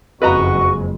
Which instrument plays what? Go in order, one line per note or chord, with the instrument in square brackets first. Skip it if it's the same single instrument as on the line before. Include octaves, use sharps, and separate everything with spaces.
[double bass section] F#1 F2 G#3 [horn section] F#4 [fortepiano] B4 D#5 A#5 [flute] C#6